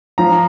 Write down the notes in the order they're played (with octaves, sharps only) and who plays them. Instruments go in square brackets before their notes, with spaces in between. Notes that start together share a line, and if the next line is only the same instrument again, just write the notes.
[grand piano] F3 A#5